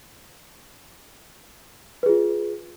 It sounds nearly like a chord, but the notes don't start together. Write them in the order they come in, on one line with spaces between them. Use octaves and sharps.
B4 G#4 F4